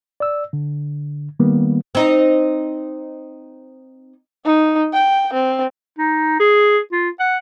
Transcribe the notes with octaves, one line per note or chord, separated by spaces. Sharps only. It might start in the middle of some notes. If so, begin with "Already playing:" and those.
D5 E6
D3
D#3 G3 A#3 B3
C4 D#4
D#4
G5
C4
D#4
G#4
F4
F#5